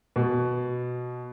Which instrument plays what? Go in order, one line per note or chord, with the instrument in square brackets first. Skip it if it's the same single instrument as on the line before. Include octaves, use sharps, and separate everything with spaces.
[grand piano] B2